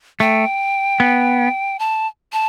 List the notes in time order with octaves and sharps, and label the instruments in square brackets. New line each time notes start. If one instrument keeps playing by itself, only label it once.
[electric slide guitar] A3 [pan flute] G5
[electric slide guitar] B3
[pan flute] A5
A5